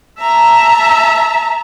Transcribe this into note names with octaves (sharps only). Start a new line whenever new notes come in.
E5 A5 A#5